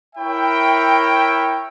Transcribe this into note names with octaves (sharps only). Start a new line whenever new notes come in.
E4 A#4 C#5 E5 G5